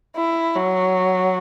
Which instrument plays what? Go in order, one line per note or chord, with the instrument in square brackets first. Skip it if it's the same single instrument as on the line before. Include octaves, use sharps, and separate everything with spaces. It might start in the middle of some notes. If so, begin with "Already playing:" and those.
[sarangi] E4
F#3